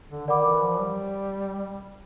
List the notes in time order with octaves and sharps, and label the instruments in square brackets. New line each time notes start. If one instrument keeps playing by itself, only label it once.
[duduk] D3
[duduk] D#3 [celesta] A#4 D5 F#5 B5 D6
[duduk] E3
F3
G3